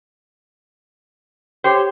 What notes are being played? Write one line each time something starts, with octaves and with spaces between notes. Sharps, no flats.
G4 C5 C#5